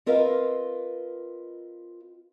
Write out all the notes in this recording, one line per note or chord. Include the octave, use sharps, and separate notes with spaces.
C4 F4 A#4 B4 D#5 F5